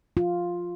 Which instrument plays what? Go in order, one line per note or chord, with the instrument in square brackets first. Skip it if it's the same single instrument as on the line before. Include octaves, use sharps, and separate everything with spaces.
[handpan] F4